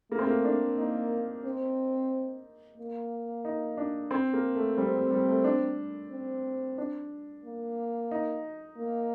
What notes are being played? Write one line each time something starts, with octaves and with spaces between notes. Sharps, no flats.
A3 A#3
C4
A#3
D4
A#3 D#4
C4
A#3
D#4
D4
C4
A#3
A3
G3 C4
G3
G3
A3
D4
C4
D4
A#3
D#4
A#3